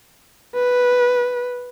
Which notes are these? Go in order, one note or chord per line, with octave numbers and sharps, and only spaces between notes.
B4